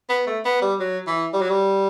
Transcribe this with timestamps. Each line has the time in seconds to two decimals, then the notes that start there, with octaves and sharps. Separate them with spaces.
0.09 B3
0.27 A3
0.45 B3
0.62 G3
0.80 F#3
1.07 E3
1.33 G3
1.41 F#3
1.50 G3